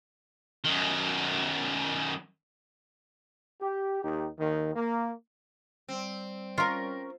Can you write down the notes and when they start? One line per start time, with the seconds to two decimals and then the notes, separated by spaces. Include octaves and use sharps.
0.64 F#2 D#3
3.61 G4
4.03 D#2 D#4 G4
4.39 D#2 D#3
4.76 A#3
5.88 G3 C4 C5 D5
6.58 C#4 F4 A#4